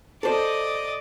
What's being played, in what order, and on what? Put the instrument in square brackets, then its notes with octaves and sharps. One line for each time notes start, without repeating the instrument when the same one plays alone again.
[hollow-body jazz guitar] A4 C5 [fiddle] D5 D#5